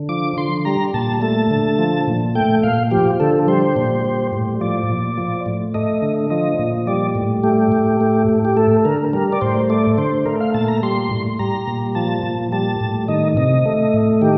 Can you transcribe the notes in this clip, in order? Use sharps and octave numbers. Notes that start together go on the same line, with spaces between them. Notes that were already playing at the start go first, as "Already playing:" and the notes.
Already playing: D3
F3 D6
D3 C6
G3 A#5
A#2 A5
A3 A5
D3
F3
A#2
A3 G5
A#2 F5
F3 G4
D3 A4
G3 C5
A#2
G3
A2
F3 D5
A#2
F3
A2
A3 D#5
D3
F3 D#5
A#2
G3 D5
A2
A3 G4
A2
A3
A2
G4
A3 A4
D3 A#4
G3 A#4
D5
A2 C5
A3 D5
D3 C5
A3 A#4
F5
A#2 A5
A#5
G3 C6
A2
G3 A#5
A#2
F3 A5
A#2
G3 A5
A2
D#3 D#5
C3 D#5
A3
A2
D#3 G4